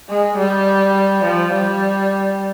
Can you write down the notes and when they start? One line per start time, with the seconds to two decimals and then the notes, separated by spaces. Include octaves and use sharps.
0.09 G#3
0.38 G3
1.25 F3
1.54 G3